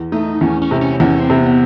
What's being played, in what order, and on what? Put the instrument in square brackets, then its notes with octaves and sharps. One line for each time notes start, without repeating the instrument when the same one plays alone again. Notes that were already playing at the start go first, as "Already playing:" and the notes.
Already playing: [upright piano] E2
[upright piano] A3 [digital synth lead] D#4
[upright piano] E2 [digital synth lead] C#4
[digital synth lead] C#4
[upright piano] C3
[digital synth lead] C#4
[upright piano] E2 [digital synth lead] C#4
[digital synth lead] C4
[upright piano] C3
[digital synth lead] B3